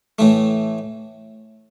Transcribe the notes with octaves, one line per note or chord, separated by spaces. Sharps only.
A2 E3 A3